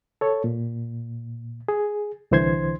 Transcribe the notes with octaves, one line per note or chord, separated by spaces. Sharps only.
A4 C#5
A#2
G#4
C2 D3 E3 C5 C6 G#6